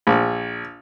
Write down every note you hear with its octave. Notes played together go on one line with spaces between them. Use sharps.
A#1